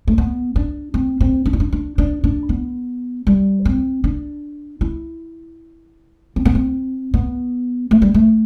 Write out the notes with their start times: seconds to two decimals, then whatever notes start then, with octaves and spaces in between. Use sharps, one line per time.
0.08 A3
0.18 B3
0.56 D4
0.94 C4
1.21 C4
1.46 D4
1.53 E4
1.60 D4
1.72 D4
1.98 D4
2.24 D4
2.49 B3
3.27 G3
3.65 C4
4.04 D4
4.81 E4
6.36 C4
6.45 B3
6.55 C4
7.14 B3
7.91 A3
8.02 G3
8.14 A3